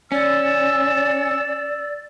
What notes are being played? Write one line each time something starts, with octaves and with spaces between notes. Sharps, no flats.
C#4 D5 E6